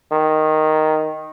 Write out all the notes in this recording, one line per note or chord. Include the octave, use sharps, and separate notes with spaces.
D#3